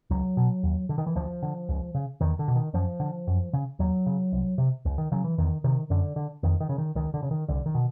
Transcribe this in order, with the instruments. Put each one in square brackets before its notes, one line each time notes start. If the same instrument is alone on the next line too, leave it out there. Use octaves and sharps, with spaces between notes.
[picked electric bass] C#2 F#3
B2
D#2
D3
D#3
E3
D2 F3
D3
C#2
C#3
E2 D#3
D3
B2
D#3
F#2 F3
D3
F#2
C#3
D#2 F#3
C#3
C2
C3
C#2
D#3
C#3 F#3
E3
E2 D#3
C3 D#3
F#2 D3
D3
F2 D#3
D#3
C#3
D#3
C#2 D#3
D3
C#3
D#3
C2 D3
D#3
B2